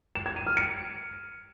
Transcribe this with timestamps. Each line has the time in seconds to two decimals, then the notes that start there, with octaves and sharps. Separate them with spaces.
0.15 E7
0.26 G#6
0.36 D#7
0.47 F6
0.57 C#7